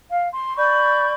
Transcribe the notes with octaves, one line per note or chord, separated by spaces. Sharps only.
F5
C6
D5 B5 C#6 G6